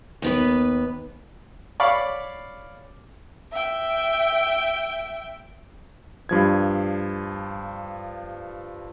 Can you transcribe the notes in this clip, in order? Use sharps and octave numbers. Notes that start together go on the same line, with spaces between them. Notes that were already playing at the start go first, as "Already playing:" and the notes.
D#2 B3 B4
C#5 D5 F5 B5 D6
E5 G5
G2 F3 G#6